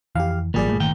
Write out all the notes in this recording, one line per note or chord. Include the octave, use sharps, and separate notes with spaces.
F2 E3 G4 F5
G#1 A#2 E3 F#3 G3 G#4 D5
G1 A3
A#2 D#3 G5